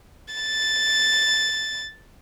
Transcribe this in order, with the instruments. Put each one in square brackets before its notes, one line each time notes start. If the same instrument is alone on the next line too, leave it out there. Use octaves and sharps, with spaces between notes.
[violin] A6